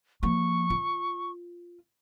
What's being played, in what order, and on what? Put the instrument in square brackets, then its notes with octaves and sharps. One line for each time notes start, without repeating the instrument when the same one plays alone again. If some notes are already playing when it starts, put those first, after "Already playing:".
[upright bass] F3 A#3 [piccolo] C#6
[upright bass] F4